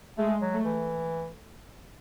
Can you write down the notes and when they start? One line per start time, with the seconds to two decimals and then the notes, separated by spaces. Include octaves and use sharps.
0.18 G#3 A3
0.41 F#3
0.53 A3
0.64 E3